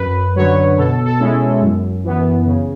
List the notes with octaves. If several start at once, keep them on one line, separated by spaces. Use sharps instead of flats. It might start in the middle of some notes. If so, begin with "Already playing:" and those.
Already playing: F#2 B4
D3 F#3 C#5
B2 A4
A4
G#3 C#4 E4
F#2
E3 B3
C#3